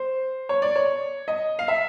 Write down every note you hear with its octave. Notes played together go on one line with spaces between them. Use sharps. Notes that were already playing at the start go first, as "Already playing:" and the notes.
Already playing: C5
C#5
D5
C#5
D#5
F5
E5